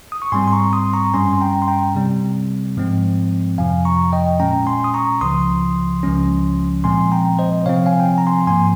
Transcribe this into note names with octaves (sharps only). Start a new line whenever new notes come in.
D#6
C#6
G#2 G3 C4 G#5 C6
C6
A#5 C#6
C6 D#6
A#5 C#6
G2 G3 C#4 G#5 C6
C6
G5 A#5
C6
G5 A#5
C3 G3 C4
G#2 F3 G#3 C4
F2 C3 F3 F5 G#5
A#5 C#6
D#5 G5
A#2 G#3 C#4 G5 A#5
G#5 C6
D#6
A#5 C#6
C#2 C#3 F3 C6 D#6
C#2 C#3 F3 G#3 C#4
A#2 F3 G#3 C4 G#5 C6
G5 A#5
C5 D#5
C3 F3 C4 C#5 F5
F5 G#5
G5
G#5
A#5
G#5 C6
G#2 F3 A#3 G#5 C6